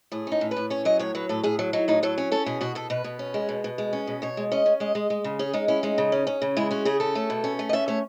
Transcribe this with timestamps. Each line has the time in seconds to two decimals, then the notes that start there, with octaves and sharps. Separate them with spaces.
0.12 A2 G#4
0.27 C#4 D#4
0.41 A2
0.51 B4
0.56 A2
0.70 C#4 C#5
0.85 F#3 D#5
0.99 A2 C#5
1.15 F#3 B4
1.29 A2 A4
1.43 A2 G#4
1.59 F#3
1.73 F#3 D#4
1.88 A2 D#4
2.03 F#3 A4
2.18 C#4
2.32 C#4 A4
2.46 B2 G#4
2.61 B2 F#4
2.75 B2 A4
2.90 B2 B4
3.04 B2
3.19 C#4
3.34 G#3
3.49 B2
3.64 B2
3.78 G#3
3.93 C#4
4.07 B2
4.22 B2 C#5
4.37 G#3
4.52 C#4 D#5
4.66 C#4
4.80 G#3 D#5
4.95 G#3
5.10 G#3
5.24 C#3
5.39 C#4 G#4
5.53 G#3 D#4
5.68 C#4 E4
5.83 G#3 D#4
5.98 C#3
6.12 C#4
6.27 C#4
6.42 C#3
6.57 G#3 E4
6.71 C#4 F#4
6.85 C#3 G#4
7.00 C#4 A4
7.15 A3
7.30 B2
7.44 C#4
7.59 A3
7.69 D#5
7.73 C#4 E5
7.88 A3 C#5